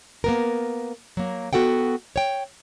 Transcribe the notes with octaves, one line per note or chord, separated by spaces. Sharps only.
A#3 B3 A#4
F#3 A#3
B3 F#4 A4 F#5 G5
C#5 G5